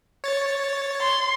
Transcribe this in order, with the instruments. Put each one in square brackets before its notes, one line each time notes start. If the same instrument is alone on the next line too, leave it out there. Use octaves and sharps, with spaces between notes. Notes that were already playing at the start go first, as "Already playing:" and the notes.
[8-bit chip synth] C#5 A6
[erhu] C6